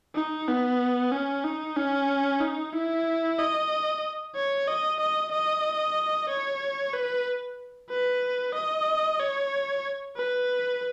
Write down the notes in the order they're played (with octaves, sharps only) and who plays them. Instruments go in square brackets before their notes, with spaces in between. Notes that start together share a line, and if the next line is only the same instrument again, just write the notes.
[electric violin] D#4
B3
C#4
D#4
C#4
D#4
E4
D#5
C#5
D#5
D#5
D#5
C#5
B4
B4
D#5
C#5
B4